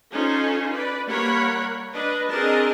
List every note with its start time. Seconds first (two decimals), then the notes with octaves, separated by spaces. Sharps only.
0.11 C#4 D#4 F4 A4 C5
0.72 B4 D5
1.07 G3 A#3 A#4 C#5 F#5 B5
1.92 D4 B4 D#5
2.30 C4 D4 G#4 A#4 D#5 A5